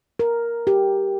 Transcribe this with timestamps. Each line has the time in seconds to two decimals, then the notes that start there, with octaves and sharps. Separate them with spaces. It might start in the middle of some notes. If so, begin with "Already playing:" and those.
0.19 A#4
0.67 G4